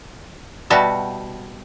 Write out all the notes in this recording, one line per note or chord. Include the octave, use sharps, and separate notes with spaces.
B2 G3 F#4 E5 G5 A5